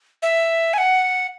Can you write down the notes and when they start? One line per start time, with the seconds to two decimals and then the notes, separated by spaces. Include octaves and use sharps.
0.22 E5
0.73 G#5
0.78 F#5